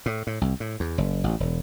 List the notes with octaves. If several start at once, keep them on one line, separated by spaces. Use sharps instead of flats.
A2
A2
C2
A2
E2
F#1
A1
E1